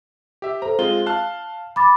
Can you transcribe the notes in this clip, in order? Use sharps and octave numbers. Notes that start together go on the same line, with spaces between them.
G4 E5
A4 C5 A#5
G#3 C4 F4 G7
F5 A5 F#6
B5 D6 A6